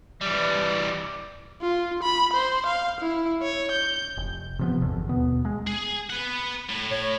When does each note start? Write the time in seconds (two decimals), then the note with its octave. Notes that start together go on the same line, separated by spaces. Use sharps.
0.21 E3 G3
1.61 F4
2.03 B5
2.33 C5
2.66 F5
3.00 E4
3.42 C#5
3.71 G6
4.17 F1
4.59 C3 F3 B3
4.81 G1 E2 D3
5.09 D#2 B2 B3
5.45 G#3
5.67 G#4
6.10 B4 F#5
6.69 A2
6.91 C#5